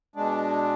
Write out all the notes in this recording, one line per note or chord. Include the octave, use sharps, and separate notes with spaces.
B2 G#3 D4